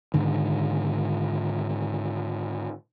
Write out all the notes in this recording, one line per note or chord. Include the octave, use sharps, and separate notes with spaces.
G#2 D3 D#3